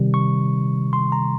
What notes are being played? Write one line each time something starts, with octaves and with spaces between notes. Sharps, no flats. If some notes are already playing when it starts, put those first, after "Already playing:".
Already playing: C3 D#3 G3
C#6
C6
A#5